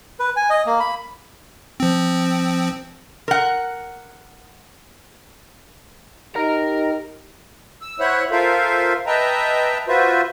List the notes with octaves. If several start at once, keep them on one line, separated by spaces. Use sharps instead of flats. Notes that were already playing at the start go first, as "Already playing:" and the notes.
B4
G#5
D#5
A#3
B5
F3 C4
A#4 F#5
D#4 G4 A#4 A#5
E6
E4 C5 C#5 E5 F#5 F#6
F4 A4 A#4 C5 E5 F5
B4 D#5 E5 G5 A5 A#5
F4 F#4 B4 C5 E5